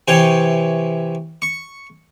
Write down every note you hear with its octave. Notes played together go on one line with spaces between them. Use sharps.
C3 E3 C#5 G5
C#6